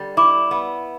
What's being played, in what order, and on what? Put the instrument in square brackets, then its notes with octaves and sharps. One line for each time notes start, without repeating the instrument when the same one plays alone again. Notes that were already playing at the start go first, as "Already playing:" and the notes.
Already playing: [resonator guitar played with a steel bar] D3 G3
[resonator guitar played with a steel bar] E4 [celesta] D6
[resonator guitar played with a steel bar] B3